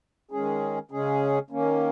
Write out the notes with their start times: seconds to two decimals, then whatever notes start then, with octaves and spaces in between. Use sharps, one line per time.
0.31 D#3 G#3 C#4 G#4
0.91 C#3 G#3 C#4 G#4
1.50 D#3 A#3 C#4